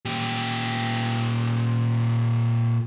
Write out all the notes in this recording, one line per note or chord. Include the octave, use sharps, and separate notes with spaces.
A#2 G4